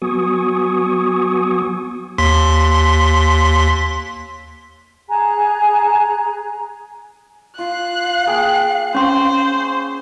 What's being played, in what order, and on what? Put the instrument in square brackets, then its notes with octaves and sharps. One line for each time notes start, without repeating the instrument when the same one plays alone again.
[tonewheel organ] F#3 B3 F#4 G#5 C#6 D#6
[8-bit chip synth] D#2 C6 B6
[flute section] G#4 G#5 A#5 F#6
[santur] F4 [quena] F5 [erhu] F#6
[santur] A#3 G#4 G5
[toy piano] C#4 C6 [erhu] C5 [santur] C#5 F#5